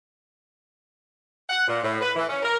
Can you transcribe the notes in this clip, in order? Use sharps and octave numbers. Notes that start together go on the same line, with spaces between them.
F#5
A#2
A2
B4
E3
C#4
A#4